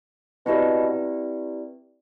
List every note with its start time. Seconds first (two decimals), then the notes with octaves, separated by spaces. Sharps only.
0.45 B2 C4 E4 G4 B4 D5